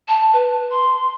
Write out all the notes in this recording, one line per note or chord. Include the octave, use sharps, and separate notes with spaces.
A5
B4
C6